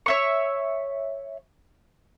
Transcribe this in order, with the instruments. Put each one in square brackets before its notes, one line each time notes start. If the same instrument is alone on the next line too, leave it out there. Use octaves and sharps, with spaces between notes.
[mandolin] C#5 E5 C#6